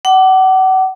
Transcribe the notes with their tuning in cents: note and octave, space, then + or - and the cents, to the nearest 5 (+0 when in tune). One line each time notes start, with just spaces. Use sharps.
F#5 +35 D6 +0